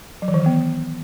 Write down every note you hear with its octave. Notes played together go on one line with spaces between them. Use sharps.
F#3
E3
D#3
E3
B3